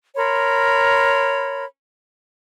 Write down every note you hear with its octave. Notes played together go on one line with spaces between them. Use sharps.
A#4 C#5 B5 C6